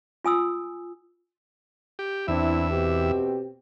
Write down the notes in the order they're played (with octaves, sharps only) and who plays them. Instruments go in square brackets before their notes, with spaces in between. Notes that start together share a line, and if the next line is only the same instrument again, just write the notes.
[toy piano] F4 G#5 D#6 E6
[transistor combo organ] G4
[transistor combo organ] E2 E5 [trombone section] C4 D4 E4
[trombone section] B2 C4 G4